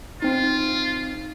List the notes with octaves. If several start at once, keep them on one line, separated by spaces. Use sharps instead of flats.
C4 D#4 F4